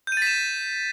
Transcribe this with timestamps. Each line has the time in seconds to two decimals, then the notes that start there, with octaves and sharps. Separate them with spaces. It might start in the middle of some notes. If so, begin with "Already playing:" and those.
0.07 G6
0.12 D#7
0.17 A6
0.22 B6
0.27 E7